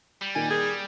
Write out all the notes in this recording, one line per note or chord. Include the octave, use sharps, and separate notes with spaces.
G3
A#2 D#3 D#4 G#5
G#4 A#4